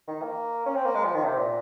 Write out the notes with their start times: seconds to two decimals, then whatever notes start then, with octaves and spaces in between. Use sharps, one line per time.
0.08 D#3
0.22 A#3
0.66 C#4
0.75 C4
0.85 A#3
0.95 G#3
1.04 F3
1.15 D#3
1.24 C3
1.39 A#2